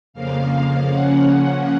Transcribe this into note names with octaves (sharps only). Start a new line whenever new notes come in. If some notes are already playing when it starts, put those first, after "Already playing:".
F2 C#3 F3 A#3 F5
C#3 F3 A#3 C#4 F#5